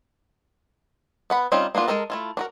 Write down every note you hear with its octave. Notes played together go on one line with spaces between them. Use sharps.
B3 F#5 B5
G3 C4 C#4 D#4 F4
A#3 B3 D4 F4
G#3 E4 A4 A#4 A5
A3 E4 F4
D4 F#4 A#4